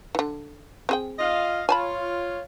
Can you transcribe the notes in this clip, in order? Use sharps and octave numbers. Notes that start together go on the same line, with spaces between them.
D3 E3
C4 G#4 G5
F4 D#5 F5
F4 C#5 G#5 A5 B5